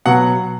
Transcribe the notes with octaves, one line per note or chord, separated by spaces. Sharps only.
B2 F#3 F#5